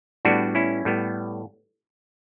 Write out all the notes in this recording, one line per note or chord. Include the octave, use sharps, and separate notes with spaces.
A2 G3 B3 D4 F#4
C#4 E4
A2 G3 B3